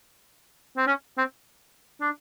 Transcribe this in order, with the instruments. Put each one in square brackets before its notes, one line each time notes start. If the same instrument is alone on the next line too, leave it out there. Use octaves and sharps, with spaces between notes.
[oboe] C4
C#4
C4
D4